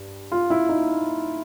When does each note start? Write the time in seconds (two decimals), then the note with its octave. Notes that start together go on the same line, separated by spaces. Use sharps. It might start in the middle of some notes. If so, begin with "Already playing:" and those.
Already playing: G2
0.32 F4
0.50 E4
0.69 D#4